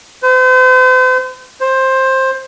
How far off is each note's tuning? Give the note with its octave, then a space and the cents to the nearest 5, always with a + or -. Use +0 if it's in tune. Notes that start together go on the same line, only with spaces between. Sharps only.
C5 -40
C5 +15